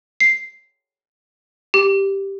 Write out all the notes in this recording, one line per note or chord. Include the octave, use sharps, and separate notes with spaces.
C7
G4